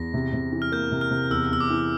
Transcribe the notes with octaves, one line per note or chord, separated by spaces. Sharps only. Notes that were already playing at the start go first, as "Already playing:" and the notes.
Already playing: E2 A#6
C3
C3
E3
F6
A#3 G6
C3
F6
C3
E2 E6
E2 E6
D6
E3